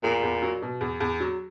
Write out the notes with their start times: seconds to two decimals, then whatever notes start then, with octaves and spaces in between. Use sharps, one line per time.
0.03 E2 A#2
0.23 E2
0.42 F#3
0.62 B2
0.81 E2
1.00 E2
1.20 F#3